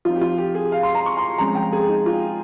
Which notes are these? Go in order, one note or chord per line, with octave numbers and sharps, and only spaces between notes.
F3 C4 D#4 F4
G4
F4
G4
G#4
F5
C6
A#5
C#6
C6
C3 F3 G#3 C#4 A#5
G5
G#4
D#4
F4